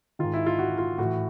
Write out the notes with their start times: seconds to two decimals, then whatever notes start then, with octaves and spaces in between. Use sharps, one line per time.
0.19 G#2 D#3 F4
0.34 E4
0.46 F4
0.59 F#4
0.78 F4
0.98 A2 E3 F#4